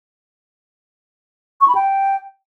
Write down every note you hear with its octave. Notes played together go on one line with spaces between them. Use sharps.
C#6
B5
G5